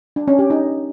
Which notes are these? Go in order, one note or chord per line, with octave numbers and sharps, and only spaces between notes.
D4
C#4
G4
D#4